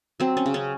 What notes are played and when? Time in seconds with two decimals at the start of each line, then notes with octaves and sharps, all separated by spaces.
0.20 F#3 C4
0.37 C#4
0.46 C#3
0.54 C#4